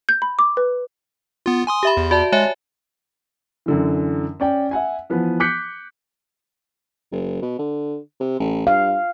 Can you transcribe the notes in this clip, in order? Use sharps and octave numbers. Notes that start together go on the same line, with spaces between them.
G6
B5
D6
B4
B3 F4
G#5 C6 D#6
G4 E5 B5
E2
F#4 D5 A5
G#3 C#5 E5 G#5
F#2 D3 E3
C#4 D5 G5
E5 F#5 G#5
E3 F3 B3 B4
D6 F#6 G6 B6 C#7
F#1
B2
D3
C3
A1
G2 F5